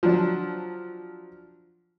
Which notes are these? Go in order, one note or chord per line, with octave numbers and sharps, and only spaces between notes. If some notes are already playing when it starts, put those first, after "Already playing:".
F3 F#3 D4